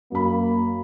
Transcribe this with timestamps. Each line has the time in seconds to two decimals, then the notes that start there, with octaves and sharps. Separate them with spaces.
0.12 F#2 A#3 B5